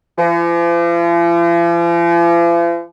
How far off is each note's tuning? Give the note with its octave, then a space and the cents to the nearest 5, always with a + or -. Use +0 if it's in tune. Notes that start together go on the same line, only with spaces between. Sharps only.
F3 -45